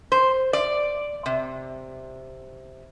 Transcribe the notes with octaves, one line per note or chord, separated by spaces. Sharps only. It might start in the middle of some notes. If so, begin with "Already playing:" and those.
C5
D5
C3